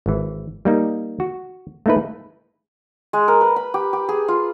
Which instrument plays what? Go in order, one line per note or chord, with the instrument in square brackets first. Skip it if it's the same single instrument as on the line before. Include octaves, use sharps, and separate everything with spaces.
[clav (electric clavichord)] G#1 E3
G3 A#3 D#4
F#4
A3 A#3 D#4 E4 B4
[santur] G#3
A#4
B4
B5
G4
G4
G#4
F4